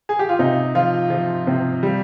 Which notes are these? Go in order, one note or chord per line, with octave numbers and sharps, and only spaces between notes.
G#4
G4
F4
C3 D#4
F3 F4
F3
C3
G3